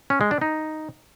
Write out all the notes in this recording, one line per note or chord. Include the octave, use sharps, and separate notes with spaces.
C#4
G#3
D4
D#4